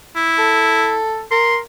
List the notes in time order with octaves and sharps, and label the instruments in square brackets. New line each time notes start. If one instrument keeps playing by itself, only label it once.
[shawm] E4
[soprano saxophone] A4
[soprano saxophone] A#4 [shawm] C6